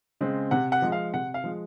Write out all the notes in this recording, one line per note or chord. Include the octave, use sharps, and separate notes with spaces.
C#3 G#3 C4
C3 F#5
F#5
F3 G#3
F5
C3 F#5
F5
F3 G#3